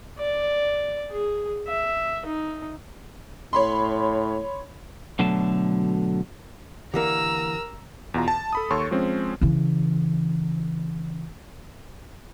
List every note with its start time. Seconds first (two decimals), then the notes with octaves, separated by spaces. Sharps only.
0.18 D5
1.11 G#4
1.67 E5
2.26 D#4
3.53 A2 C#5 B5 C6
5.19 B2 D3 F#3 A3 A5
6.94 D3 E3 A#3 G4 A#4 A#5 E6
8.14 E2 B2 F4 A#5
8.28 A5
8.53 A4 B5 D#6
8.70 D#2 A4 C#5 C6 C#6
8.91 F3 G#3 C4 C#4
9.41 C#3 E3